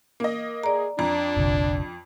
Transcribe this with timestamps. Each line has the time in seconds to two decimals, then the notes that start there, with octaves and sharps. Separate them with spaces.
0.20 A#3 D#5
0.63 G#4 D5 A#5
0.99 F2 D4 A#5
1.36 F1 A#1 D3